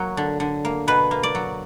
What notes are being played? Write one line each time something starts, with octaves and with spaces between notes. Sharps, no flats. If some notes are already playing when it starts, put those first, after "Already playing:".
Already playing: F#3 A#3
D3
D3
A#3
B2 B4
A#3
D5
F#3